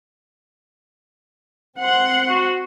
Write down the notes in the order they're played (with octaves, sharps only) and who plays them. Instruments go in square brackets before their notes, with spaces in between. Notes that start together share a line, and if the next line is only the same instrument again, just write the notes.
[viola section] C4 F#5 C6
[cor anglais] F#4